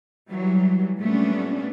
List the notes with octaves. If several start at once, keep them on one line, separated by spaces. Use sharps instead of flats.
E3 F#3 G3
A#2 G3 A3 B3 C#4 D4